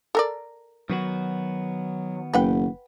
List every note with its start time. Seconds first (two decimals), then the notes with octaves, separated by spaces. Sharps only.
0.15 A4 A#4 D5
0.90 D#3 F#3 B3 F#4
2.34 F#1 B4 F#5 G5